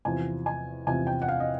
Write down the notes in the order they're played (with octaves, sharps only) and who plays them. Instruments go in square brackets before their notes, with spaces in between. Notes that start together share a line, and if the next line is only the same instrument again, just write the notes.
[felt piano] E2 C3 F3 G#5
G#5
E2 C3 F3 G#5
G5
F#5
F5
D#5